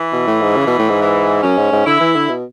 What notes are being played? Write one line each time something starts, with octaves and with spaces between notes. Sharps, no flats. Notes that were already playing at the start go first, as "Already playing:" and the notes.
Already playing: E3
B2
A2
G#2
C#3
B2
A2
G#2
E3
F#2 C#4
G#2
G#2
D3 E4
E3
D3
B2